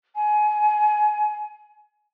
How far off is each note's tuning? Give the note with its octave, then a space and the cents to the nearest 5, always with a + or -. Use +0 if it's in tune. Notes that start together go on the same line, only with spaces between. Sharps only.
G#5 +25